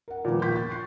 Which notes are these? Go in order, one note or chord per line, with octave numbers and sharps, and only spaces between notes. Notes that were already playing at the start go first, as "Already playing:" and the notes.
A#4 F#5
A#2 D#3 F3 B3
A#3 C6 C#6 G6 B6
A6
C#6 F#6 C7